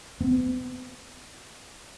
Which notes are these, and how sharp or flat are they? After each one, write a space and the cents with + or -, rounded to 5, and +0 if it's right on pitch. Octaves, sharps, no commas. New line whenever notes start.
B3 +45